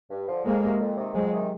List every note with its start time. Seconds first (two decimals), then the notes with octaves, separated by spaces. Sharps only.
0.10 G2
0.28 D3 F3
0.45 F2 G#3 A#3
0.63 C3 D#3
0.80 F2
0.96 C3 D#3
1.14 F2 F#3 G#3
1.32 C3 D#3